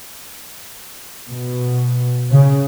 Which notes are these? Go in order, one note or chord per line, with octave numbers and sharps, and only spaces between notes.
B2
C#3